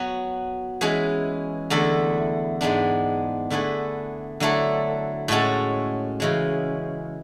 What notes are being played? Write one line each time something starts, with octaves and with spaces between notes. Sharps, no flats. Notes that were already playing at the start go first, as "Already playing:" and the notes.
Already playing: F#3 B3 F#4
E3 G#3 C#4 G#4 B4
E2 D3 A3 E4
G#2 G#3 B3 D4
D3 A3 E4 G#4 B4
D3 F#3 A3 E4 A4
A2 G#3 C#4 F#4 A4
C#3 E3 G#3